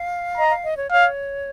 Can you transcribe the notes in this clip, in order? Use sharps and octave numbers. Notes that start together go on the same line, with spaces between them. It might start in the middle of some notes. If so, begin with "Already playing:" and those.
Already playing: F5
D#5 A#5
F5
D#5
C#5
C#5 F5